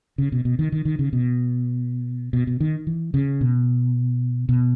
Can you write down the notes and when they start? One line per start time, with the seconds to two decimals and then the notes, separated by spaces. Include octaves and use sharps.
0.18 C#3
0.32 B2
0.45 B2
0.59 D#3
0.72 D#3
0.85 D#3
0.99 C#3
1.13 B2
2.33 B2
2.47 B2
2.60 D#3
2.87 E3
3.14 C#3
3.41 B2
4.49 B2